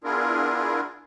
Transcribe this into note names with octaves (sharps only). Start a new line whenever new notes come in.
B3 D4 E4 F4 G#4 A#4